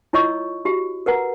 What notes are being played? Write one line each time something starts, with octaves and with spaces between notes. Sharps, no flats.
E4 F4 C#5 D#5 C#6 E6
F#4 G4
A#4 B4 F#5 A#5